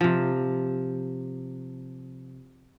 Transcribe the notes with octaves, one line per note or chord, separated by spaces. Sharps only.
C3 F3